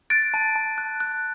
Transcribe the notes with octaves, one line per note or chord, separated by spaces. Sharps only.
F#6 A6 D7
A5
A5
F#6
F#6